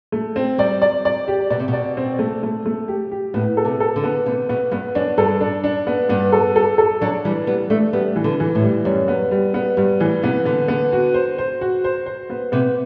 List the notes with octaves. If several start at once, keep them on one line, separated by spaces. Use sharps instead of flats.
A3
C4
G3 D5
D5
D5
G4
B2 D5
C3
B2 D5
C4
A3
A3
A3
G4
G4
A2 B3
A4
C3
A4
D3
B3
C3 B3
B2 B3
G2 B3
F#2 D4
G2 A4
D4
D4
B3
G2 B3
A4
A4
A4
F#3 D4
E3 G3
G3 B3
A3 D4
G3 B3
E3
D3
E3
A2
G3
F#2 G3
B3
G3
B3
G2 G3
A2 E3
C3 B3
D3 B3
B3
F#4
C5
C5
F#4
C5
C5
B3
C3 B3